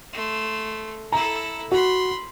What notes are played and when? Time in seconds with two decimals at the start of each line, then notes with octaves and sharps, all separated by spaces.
0.13 A3 C6
1.12 E4 A4 A#5
1.72 F#4 B5 C6